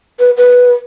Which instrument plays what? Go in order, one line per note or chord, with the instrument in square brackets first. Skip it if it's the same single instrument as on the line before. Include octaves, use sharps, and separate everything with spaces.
[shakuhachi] B4
B4